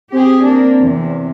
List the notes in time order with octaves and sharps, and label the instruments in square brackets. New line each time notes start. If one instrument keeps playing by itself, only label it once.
[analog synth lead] C4 [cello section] G4 G#4
[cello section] A#3 D4
E2 C3